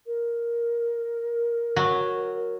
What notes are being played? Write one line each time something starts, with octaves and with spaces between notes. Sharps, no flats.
A#4
F#3